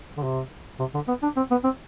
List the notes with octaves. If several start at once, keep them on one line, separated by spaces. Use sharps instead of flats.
D3
C3
C3
D3
B3
D4
C4
B3
C4